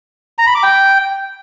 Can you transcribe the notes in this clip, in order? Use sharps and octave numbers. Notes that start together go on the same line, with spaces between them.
A#5
B5
D6
G5